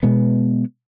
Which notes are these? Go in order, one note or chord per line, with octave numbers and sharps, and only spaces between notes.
B2 G#3 B3